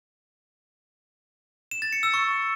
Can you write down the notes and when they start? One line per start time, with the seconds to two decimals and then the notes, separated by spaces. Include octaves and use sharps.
1.71 E7
1.82 A6
1.93 C#7
2.03 E6
2.14 C#6